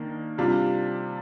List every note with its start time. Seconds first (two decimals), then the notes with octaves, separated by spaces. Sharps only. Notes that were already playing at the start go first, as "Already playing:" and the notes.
Already playing: D#3 A#3 D4
0.38 C3 G3 D4 F4